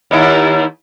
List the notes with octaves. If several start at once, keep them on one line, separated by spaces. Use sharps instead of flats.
D#2 D#4 E4